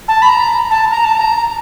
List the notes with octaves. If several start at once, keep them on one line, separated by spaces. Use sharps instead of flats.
A5
B5
A#5
A5
A#5
A5
A#5